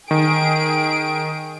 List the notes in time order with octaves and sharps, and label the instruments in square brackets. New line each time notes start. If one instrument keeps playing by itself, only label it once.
[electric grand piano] D#3 [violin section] G#4 D7